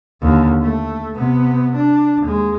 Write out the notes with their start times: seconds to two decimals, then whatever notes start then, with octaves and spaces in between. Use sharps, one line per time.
0.22 D#2 D3
0.62 A3
1.16 C3 B3
1.76 D4
2.23 D#2 G#3